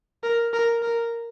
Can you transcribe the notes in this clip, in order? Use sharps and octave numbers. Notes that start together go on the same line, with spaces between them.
A#4
A#4
A#4